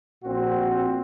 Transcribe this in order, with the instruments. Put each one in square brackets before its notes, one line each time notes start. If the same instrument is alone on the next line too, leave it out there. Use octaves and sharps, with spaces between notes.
[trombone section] A#1 A#2 C4 F#4